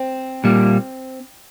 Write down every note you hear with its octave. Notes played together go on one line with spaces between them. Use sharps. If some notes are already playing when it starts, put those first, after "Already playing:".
Already playing: C4
A#2 G3 A#3